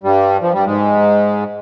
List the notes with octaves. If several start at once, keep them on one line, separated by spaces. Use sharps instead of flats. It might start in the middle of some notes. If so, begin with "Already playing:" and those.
G2 G3
F3
G2 G3
G#2 G#3